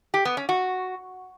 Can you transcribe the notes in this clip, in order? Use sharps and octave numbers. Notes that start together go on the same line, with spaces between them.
G4
B3
C#4
F#4